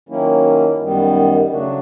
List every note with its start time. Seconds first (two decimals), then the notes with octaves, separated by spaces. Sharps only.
0.09 D#3 F#3 A#3 C#4 E4
0.80 F#2 D#3 G3 B3
1.50 C#3 F#3 A3 D4 F#4